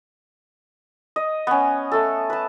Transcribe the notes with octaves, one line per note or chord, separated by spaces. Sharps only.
D#5
B3 C#4
A3 A4
B4 A5